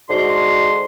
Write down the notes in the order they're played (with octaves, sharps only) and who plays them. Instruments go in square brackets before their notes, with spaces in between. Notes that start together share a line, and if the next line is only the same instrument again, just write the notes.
[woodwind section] G#2 D3 F#4 C6